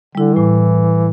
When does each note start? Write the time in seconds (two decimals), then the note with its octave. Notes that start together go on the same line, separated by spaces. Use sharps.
0.15 D3 G3 E4
0.36 A2 E3